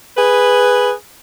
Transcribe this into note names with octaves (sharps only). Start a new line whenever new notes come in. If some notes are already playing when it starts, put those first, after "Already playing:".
G#4 B4